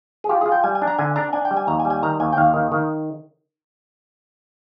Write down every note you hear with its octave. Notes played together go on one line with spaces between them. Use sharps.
G#4
F4 G4
G#4
F4
G5
G3 G#5
G#5
D4
A#5
D3 G#5
D4 A#5
D4 G#5
G5
G3
G#5
D#2 A#5
G#5
G3
G#5
D#3 A#5
D#2 G#5
G5
D#2 F5
D#3
D#3